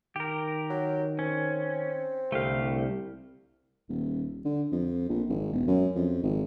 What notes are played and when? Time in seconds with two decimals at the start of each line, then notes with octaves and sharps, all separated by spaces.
0.16 D#3 G4 A#4
0.70 F#3
1.19 C4 C#4
2.32 C2 D3 A3 G4 F5
3.89 D#1
4.45 D3
4.72 F2
5.09 A#1
5.29 G#1
5.53 E1
5.67 F#2
5.95 F2
6.23 G#1